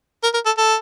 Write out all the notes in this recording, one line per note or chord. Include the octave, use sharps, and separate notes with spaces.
A#4
A#4
A4
A4